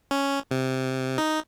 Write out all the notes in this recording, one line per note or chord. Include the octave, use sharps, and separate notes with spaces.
C#4
C3
D#4